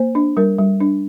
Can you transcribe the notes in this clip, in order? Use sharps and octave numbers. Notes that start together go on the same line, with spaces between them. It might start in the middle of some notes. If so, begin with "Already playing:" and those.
Already playing: A#3 C5
D4
G3 A#4
G3
D4